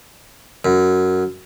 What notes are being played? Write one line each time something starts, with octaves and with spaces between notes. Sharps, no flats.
F#2